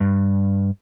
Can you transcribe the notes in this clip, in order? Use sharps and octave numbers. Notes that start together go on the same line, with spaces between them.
G2